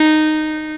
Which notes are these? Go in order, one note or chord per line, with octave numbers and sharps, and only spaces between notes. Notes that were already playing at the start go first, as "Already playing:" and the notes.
Already playing: D#4